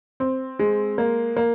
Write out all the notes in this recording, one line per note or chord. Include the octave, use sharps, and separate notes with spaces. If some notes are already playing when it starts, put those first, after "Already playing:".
C4
G#3
A#3
A#3